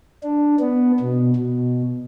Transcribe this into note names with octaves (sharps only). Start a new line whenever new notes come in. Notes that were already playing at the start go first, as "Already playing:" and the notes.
D4
B3
B2
B2